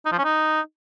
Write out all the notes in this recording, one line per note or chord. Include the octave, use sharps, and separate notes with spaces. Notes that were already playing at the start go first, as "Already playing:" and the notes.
D#4
F3
C#4
D#4